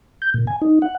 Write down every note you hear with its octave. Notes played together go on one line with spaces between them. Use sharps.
G6
A#2
G#5
D#4
F#5